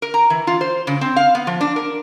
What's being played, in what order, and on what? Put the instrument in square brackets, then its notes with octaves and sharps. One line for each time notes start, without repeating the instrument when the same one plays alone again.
[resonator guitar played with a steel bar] A#4
A#5
E3
F4
C5
C#3
C4
F5
B3
F3
D4
A#4